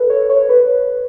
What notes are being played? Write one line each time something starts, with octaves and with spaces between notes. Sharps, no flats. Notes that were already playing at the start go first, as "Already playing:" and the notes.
Already playing: A4 B4
C#5
C#5
B4